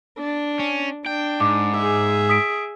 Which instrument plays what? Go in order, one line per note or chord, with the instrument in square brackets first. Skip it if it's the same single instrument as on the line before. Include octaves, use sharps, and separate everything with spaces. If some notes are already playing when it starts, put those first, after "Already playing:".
[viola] D4
[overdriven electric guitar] C#4
[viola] D4 [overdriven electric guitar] G5
[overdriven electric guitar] G#2 [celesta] D6
[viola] G#4 E5
[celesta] D#6 B6 D7